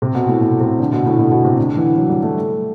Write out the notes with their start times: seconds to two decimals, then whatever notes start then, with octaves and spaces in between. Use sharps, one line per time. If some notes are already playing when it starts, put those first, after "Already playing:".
0.02 C3
0.15 B2
0.28 A2
0.41 B2
0.60 C3
0.80 D3
0.92 B2
1.06 A2
1.19 B2
1.32 B2
1.44 C3
1.57 D3
1.77 E3
1.97 F#3
2.10 G3
2.23 A3